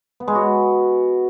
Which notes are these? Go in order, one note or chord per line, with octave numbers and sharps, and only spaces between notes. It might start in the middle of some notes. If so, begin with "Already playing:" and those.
B3
G#3
F#4